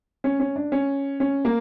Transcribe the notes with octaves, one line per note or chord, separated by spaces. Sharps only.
C#4
C#4
D4
C#4
C#4
A#3